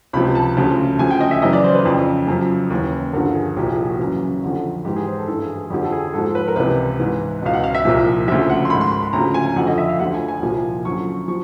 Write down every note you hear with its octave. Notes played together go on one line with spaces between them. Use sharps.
C#2 C3 F3 B5
A5
D2 C#3 F3
D2 C#3 F3 G#5
G5
D#5
E5
F#2 C#3 E3 D#5
D5
C5
B4
F2 C#3 F3
F#2 C#3 F3
D#2 C#3 E3
G2 D3 F3 A#4
G#4
C2 A#2 F3 G4
G#4
G#4
F#4
F#2 C#3 E3
F2 D3 F3
G#2 E3 G4
G#4
C5
A4
G2 E3 A4
G#4
G#4
F2 D3 F3 G4
A4
G#4
G#2 F3 A4
B4
A#4
C#2 C3 E3 B4
G#2 E3
C#2 B2 F5
F#5
F5
E5
C2 A#2 F3
D2 C#3 F3 E5
F#5
C6
G#2 D#3 B5
C6
C6
B5
D2 C#3 F3 A#5
G#5
F2 D3 F3 F#5
D#5
E5
F5
D2 D3 F3 F#5
G#5
G#5
C2 A#2 F3
F#2 D3 F3 C#6
F3 C#6